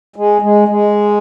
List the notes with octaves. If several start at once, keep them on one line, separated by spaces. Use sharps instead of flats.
G#3
G#3
G#3